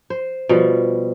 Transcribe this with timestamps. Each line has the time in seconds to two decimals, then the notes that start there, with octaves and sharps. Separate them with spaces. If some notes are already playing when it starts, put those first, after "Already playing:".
0.10 C5
0.49 B2 F3 G3